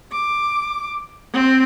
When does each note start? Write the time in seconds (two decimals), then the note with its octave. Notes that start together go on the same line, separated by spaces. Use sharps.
0.12 D6
1.33 C4